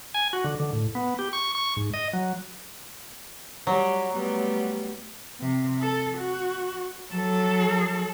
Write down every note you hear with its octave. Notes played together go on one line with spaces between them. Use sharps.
G#5
F#4
D3
D3
A2
B3
G4
C#6
C#6
G#2
D#5
F#3
F#3 G3
G3 A3 B3
C3
A4
F#4
F#3 A4